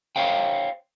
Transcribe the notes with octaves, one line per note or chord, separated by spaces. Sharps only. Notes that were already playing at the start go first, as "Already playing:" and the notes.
C5 C#5 F5 G5